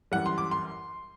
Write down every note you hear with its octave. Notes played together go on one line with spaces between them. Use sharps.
F#2 E3 G3 F#5
C6
D6
C6